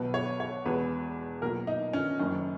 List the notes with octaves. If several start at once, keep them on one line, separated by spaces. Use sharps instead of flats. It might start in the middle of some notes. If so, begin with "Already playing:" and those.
Already playing: B1 B2 B4
C#5
C#5
E1 E2 B2 B4
B1 A#2 A#4
D#4
C#4
F#1 F#2 D#3 C#4